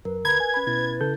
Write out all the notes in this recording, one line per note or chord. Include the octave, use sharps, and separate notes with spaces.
F#2 A#4 B4
D2 B4 A#5 B5 G#6
G#5
C#4 B5
B2 E4 A6
C#3 A4 G6